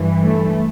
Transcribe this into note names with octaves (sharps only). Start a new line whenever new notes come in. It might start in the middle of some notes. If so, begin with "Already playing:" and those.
Already playing: G2 E3
A3